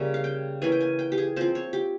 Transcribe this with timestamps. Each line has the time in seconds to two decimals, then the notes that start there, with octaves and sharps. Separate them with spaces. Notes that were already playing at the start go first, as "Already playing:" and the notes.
Already playing: C#3 G3 A#3 C#5 E5
0.14 F5
0.24 G5
0.62 E3 A#3 C#4 G#5
0.72 G5
0.81 G#5
0.99 G5
1.12 G4
1.18 G#4
1.36 F3 C4 C5
1.55 C#5
1.73 G4